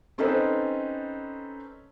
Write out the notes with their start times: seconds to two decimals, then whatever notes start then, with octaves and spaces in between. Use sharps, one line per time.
0.18 C4 C#4 D#4 A4 B4 C5